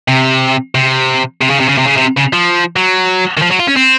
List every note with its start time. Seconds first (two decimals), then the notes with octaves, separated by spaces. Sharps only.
0.08 C3
0.75 C3
1.42 C3
1.50 C#3
1.60 C3
1.69 C#3
1.79 C3
1.87 C#3
1.97 C3
2.18 C#3
2.33 F3
2.76 F#3
3.37 D#3
3.42 F3
3.51 F#3
3.60 F4
3.68 C#4
3.76 C4